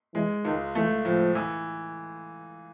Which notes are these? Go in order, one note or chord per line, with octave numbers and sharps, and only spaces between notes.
E3 G#3
C#2 D#3
E3 A3
A2 F3
E3